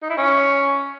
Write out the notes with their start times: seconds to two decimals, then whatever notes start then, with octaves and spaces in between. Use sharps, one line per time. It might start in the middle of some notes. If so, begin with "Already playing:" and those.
0.02 D#4
0.10 E4
0.17 C#4